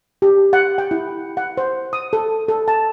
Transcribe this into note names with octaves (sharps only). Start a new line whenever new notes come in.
G4
F#5
G5
E4
F#5
C5
D#6
A4
A4
A5